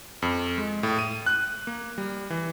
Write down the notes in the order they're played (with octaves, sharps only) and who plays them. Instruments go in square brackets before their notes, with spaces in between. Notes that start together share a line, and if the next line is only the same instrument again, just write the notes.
[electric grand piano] F2
G#3
A2
D#7
F#6
A#3
G3
E3